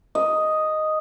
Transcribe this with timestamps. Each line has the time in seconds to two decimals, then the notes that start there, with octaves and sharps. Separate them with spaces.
0.15 D#5